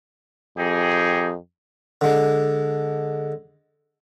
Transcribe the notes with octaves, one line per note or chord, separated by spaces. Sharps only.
F2 D#4 G4 G#4
D3 G#3